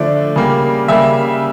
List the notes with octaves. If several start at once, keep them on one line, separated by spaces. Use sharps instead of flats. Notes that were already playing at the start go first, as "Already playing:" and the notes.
Already playing: D3 F3 A3 D5
C#3 G3 A#3
C#3 G3 A#3 E5